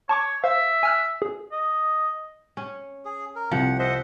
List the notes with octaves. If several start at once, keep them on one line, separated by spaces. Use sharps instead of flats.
C#5 A5 C#6 D6
C5 E5 F5
G#5 F6 F#6
G#4
D#5
C#4
G#4
A#4
C2 C3 F3 F#5
C5 D#5 E5 F#5